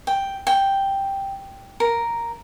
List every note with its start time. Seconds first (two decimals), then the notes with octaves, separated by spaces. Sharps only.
0.07 G5
0.47 G5
1.80 A#4